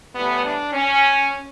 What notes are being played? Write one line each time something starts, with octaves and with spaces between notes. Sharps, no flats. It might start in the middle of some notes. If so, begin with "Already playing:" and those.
A2 E3 G3 B3
D4
C#4